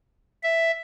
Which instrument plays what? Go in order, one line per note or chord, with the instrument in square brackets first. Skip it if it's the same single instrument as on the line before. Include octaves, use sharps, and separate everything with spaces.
[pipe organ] E5